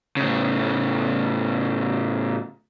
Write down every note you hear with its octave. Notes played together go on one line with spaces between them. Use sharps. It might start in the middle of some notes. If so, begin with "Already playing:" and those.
A2 C#3